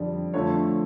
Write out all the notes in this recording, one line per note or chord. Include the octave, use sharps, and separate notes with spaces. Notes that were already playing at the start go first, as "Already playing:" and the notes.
Already playing: F2 D3 G3 D5
F2 D3 F3 A3 C#5